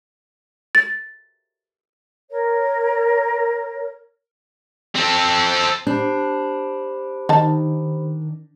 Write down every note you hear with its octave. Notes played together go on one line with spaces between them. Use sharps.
A6
A#4 C#5
C4 A4
D4 G4 C5 B5
D#3 D#4 A5